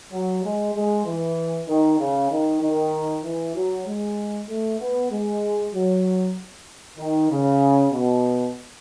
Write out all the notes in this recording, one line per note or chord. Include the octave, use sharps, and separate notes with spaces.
F#3
G#3
G#3
E3
D#3
C#3
D#3
D#3
E3
F#3
G#3
A3
B3
G#3
F#3
D#3
C#3
B2